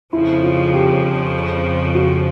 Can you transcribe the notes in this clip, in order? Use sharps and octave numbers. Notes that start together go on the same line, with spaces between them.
F2 C#3 F3 E4
F4
G4
F#4